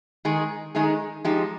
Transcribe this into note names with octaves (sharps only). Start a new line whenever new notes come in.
D#3 G#3 D#4 G#4
D#3 G#3 D#4 G#4
F3 G#3 D#4 G4